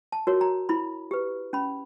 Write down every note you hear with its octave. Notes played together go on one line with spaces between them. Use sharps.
A5
F#4 A#4 C#5
A#5
E4 B5
G4 B4
C#4 B5